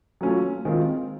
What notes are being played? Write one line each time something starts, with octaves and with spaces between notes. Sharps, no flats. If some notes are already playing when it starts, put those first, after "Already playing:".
F#3 A3 C#4 F4
D#3 G#3 C4 F4